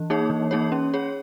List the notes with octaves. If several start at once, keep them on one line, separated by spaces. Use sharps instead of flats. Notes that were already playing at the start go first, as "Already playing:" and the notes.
Already playing: E3
A#3 D#4 G#4 C#5
E3
A#3 D#4 G#4 C#5
C#4
G#4 C#5